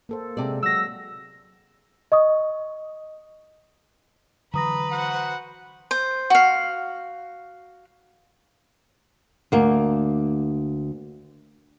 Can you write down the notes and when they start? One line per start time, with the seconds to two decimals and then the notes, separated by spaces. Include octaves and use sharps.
0.09 A#3 A4 C5
0.37 C3 G#3 A4 D5
0.63 F#3 E6 A#6
2.12 D#5 C#6 D#6
4.54 D3 E3 F#3 B4 A#5 D#6 A#6
4.91 F#4 C5 F#5
5.91 C5
6.30 F#4 F5
9.52 D2 A#3